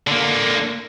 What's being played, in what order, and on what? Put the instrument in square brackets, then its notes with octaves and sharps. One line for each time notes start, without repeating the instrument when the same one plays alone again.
[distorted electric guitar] D3 A#3